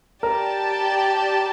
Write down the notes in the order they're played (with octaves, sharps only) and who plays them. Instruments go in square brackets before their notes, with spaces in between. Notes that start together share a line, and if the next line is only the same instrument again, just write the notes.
[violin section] G4 D5 A5 [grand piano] A#4